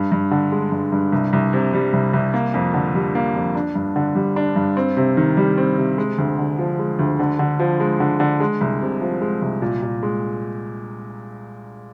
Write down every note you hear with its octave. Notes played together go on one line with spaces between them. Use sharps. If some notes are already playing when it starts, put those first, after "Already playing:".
Already playing: G2
G2
D3
G#3
G2
G2
C2
C2
C3
G3
C2
C2
A#3
F2
D3
G3
A#3
F2
D4
G2
D3
G3
D4
G2
C4
C3
D#3
G3
C4
C3
G#3
D2
D3
F3
G#3
D2
D3
D3
F3
G#3
D3
D3
G#3
C2
C3
F3
G#3
C2
A#2
A#2
G#3